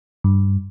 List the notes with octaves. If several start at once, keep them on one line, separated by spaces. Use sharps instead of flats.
G2